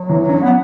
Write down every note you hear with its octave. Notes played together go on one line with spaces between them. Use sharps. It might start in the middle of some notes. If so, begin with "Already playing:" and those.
Already playing: F#3
E3
C#4
B3